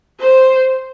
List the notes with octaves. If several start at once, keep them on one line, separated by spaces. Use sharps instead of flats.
C5